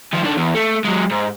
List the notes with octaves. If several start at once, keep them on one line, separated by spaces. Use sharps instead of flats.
D#3 F3
D#3 D4
E2
A3
F#3 G#3
G#2